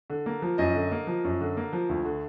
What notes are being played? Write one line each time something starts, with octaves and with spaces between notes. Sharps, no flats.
D3
A#3
F3
F#2 D#5
D3
A#3
F3
F#2
D3
A#3
F3
D2
D3